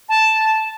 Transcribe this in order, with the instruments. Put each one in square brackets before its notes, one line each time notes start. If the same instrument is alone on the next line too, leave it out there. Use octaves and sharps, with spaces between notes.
[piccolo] A5